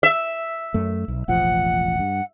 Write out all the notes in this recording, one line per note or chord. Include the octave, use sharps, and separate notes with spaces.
E5
F#2 A3
B1
E1 A1 F3 F#5
G2